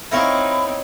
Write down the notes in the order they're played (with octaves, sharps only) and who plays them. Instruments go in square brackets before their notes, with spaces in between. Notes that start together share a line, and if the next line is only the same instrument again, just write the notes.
[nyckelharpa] C4 D#4 [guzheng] E4 A#4 C#5 [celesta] E5 F5 [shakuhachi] B5